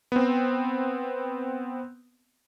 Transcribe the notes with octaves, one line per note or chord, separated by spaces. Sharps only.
B3 C4